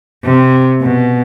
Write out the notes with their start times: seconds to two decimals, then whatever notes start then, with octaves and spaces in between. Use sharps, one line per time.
0.24 C3
0.81 B2